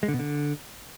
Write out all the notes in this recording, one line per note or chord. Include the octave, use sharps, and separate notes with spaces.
G#3
D3
B2
D3